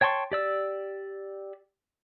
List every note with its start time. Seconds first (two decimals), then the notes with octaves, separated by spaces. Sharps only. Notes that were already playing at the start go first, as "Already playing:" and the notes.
0.01 C#5 G5 A5 C6 C#6
0.32 G4 D5 E6